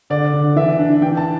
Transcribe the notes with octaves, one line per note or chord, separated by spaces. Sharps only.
D3 D5
D3
E3 E5
D4
E3 G5
A5